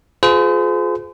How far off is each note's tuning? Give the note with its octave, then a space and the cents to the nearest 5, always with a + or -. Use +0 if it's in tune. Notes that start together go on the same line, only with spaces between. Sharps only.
F4 +25 G#4 +30 C5 -40